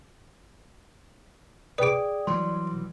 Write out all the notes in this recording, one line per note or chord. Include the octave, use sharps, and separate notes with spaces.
G#4 B4 D5 G5 D6 D#6
E3 F#3 G3 C6